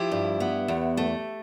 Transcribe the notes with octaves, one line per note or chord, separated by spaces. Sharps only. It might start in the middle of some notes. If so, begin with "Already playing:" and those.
Already playing: F3 E4 G4
G2
B3
E2
A3